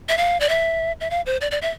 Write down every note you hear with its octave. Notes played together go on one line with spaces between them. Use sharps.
E5
F5
D5
E5
E5
F5
C5
D5
D5
E5